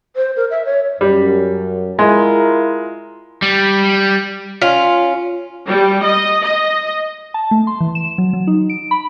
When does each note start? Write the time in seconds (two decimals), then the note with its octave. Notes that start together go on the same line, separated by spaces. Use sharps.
0.16 C5
0.36 A#4
0.51 E5
0.65 C#5
1.01 F#2 G3
1.99 G#3 E4 F4 A#4
3.42 G3
4.61 C#4 F4
5.67 G3
6.03 D#5
6.42 D#5
7.34 A5
7.51 A3
7.67 C6
7.81 E3
7.95 E7
8.18 F#3
8.33 F#3
8.47 D#4
8.70 D7
8.91 B5